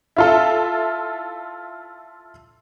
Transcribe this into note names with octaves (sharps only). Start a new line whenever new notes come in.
E4 F4 A4